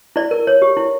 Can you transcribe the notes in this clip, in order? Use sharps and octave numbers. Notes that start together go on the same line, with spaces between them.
E4 D5
A#4
C#5
G4
E4